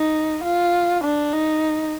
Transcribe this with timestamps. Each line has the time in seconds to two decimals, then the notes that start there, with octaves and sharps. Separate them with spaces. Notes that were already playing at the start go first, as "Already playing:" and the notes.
Already playing: D#4
0.44 F4
1.04 D4
1.33 D#4